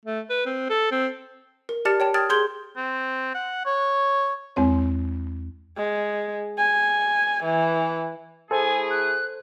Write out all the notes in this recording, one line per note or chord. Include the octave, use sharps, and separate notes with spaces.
A3
B4
C4
A4
C4
A#4
G4 D5 A5 F6 A6 C#7
C#5 G5 A5
G5 D#6 F6 G#6 A6
G#4 C6 G6 G#6 G7
C4
F#5
C#5
E2 G#3 C4 C#5
G#3
G#5
E3
A3 E4 G#4 A4 C5 G#5
F#6